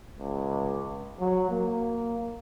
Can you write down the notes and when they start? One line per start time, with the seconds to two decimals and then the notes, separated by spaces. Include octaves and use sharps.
0.19 C#2
1.20 F#3
1.50 A#3